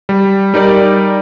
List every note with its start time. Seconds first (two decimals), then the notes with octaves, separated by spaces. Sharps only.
0.09 G3
0.54 G3 D#4 A#4 D5